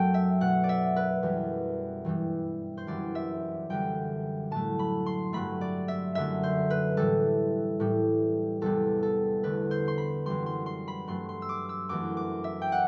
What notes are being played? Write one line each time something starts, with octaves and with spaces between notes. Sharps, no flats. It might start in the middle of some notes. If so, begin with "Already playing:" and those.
Already playing: F#2 F#3 A3 G5 A5
E5
B2 A3 F#5
D5
E5
B4
F#2 E3 G3
G2 E3 G3
C5
F#2 E3 G3 D5
E5
F#2 D3 G3 G5
A2 F#3 A3 A5
B5
C6
G2 F#3 A3 B5
D5
E5
F#2 D3 A3 E5
C5
B4
A2 E3 G3 A4
A2 G3
E2 C3 G3 A4
A4
E2 D3 A3 B4
C5
C6
B5
F#2 E3 G3 C6
C6
C6
B5
G2 F#3 A3 C6
C6
E6
D6
E6
F#2 E3 A3 D6
D6
E5
G5
F#5